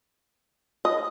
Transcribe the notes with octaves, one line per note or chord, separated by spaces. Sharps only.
D#5